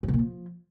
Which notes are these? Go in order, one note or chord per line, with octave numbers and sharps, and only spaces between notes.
F#2
B2
A#2
F3